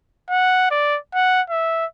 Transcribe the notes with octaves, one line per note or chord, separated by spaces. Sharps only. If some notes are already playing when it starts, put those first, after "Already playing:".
F#5
D5
F#5
E5